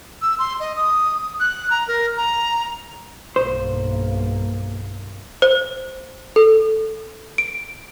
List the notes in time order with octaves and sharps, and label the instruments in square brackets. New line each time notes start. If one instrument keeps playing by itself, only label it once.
[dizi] E6
C6
D#5
D#6
F#6
A#5
A#4
A#5
[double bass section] B1 G2 A#3 [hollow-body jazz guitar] C5
[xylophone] C5
A4
D7